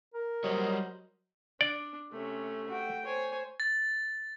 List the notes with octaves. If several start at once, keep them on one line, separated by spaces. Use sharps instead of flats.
A#4
F#3 G3 C5 C#5 D#5
D4 D5
C3 A3 C#4
F#4 G5
C5 C#5 G#5
A6